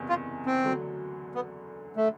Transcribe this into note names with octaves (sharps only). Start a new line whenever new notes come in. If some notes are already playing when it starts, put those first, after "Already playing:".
Already playing: F#1 E2 C3
F4
C4
D2 D3 F#3
B3
A3